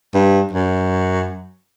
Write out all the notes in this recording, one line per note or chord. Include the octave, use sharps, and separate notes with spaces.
G2
F#2